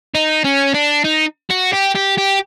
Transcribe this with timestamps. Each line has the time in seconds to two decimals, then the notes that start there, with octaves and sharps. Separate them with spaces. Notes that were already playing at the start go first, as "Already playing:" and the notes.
0.15 D#4
0.45 C#4
0.75 D4
1.05 D#4
1.50 F#4
1.73 G4
1.95 G4
2.18 G4